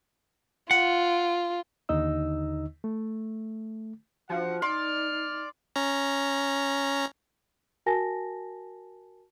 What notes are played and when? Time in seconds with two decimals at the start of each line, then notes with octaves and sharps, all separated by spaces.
0.71 F4 F#5
1.89 D#2 D3 D#4 D#5 E6
2.84 A3
4.30 F3 D4 F#4 F#5
4.62 D#4 D5 C6 F6
5.76 C#4 A#5
7.86 F#4 A#4 G#5 A5 A#6